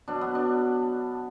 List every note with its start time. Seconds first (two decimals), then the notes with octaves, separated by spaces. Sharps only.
0.08 B2 F#3 D4
0.21 B3
0.35 D4